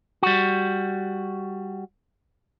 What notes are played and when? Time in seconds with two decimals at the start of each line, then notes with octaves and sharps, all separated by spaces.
0.23 G3 F#4